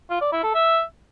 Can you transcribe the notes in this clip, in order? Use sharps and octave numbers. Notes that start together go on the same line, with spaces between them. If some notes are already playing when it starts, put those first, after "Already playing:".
F4
D5
E4
A4
E5